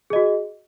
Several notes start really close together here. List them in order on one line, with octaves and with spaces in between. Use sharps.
G#4 D#5 F#4